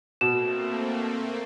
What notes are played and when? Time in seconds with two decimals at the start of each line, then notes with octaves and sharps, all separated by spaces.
0.21 B2 A3 A#3 C4 E7